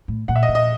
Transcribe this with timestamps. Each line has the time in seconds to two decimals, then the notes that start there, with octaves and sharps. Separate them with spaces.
0.08 A2
0.28 A#2 F#5
0.36 E5
0.43 D#5
0.49 A#2
0.55 D#5